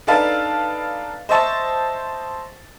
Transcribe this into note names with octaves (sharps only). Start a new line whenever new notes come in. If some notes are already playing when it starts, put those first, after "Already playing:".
D4 D#4 A4 B4 F5 A5
C5 D#5 E5 A5 C#6